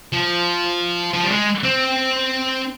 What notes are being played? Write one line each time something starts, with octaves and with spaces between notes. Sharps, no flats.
F3
F3
G3
G#3
C4